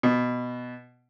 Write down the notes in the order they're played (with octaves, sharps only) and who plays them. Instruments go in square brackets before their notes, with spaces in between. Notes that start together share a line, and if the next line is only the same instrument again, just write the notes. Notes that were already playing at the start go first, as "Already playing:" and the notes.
[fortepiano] B2